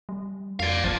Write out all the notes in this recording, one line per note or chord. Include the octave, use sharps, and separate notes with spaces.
G3
F2 D5 F5
A1 F3